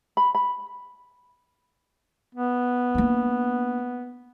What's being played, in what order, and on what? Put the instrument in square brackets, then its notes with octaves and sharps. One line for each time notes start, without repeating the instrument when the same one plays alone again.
[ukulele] B5
B5
[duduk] B3
[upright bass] A#3 D4